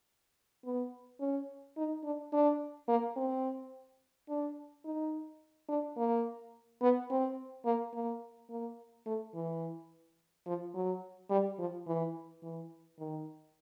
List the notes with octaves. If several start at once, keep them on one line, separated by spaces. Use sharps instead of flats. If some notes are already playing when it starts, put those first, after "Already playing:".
B3
C#4
D#4
D4
D4
A#3
C4
D4
D#4
D4
A#3
B3
C4
A#3
A#3
A#3
A3
E3
F3
F#3
G3
F3
E3
E3
D#3